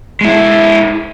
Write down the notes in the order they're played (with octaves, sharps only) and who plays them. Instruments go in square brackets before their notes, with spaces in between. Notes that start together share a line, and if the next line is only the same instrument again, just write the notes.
[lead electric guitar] G#3 E4